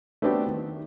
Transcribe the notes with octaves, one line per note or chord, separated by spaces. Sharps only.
A3 B3 C4 D4 F#4 G4
D#3